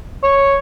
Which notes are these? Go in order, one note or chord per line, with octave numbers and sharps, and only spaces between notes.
C#5